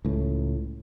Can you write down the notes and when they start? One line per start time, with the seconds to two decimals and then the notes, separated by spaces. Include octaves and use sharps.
0.05 C#2 A2